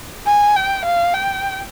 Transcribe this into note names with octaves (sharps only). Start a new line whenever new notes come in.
G#5
G5
F5
G5